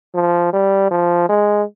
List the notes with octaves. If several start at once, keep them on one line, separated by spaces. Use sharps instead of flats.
F3
G3
F3
G#3